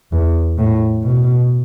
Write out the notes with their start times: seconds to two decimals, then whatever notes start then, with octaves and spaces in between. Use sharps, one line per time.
0.12 E2
0.58 A2
1.03 B2